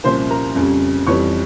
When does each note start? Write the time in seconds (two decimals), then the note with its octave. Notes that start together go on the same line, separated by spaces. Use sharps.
0.04 C2 A#2 F3 A#3 C#4 C5 C6
0.30 A#4 A#5
0.56 F2 C#3 G3 C#4
1.07 F2 E3 G3 C#5 C#6